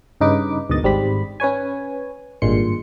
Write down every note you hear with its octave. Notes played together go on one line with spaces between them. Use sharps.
G2 C#3 D#4 B4 D6
D2 G#2 B2 D#3 D#5 A6
G#1 G#2 G3 C4 G4 B5
C#4 B4 C#5 G#5
G#1 G2 A#2 G#3 C6 C#7